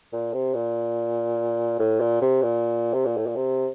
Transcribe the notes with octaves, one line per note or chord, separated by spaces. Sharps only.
A#2
C3
A#2
A2
A#2
C3
A#2
C3
A#2
A2
A#2
C3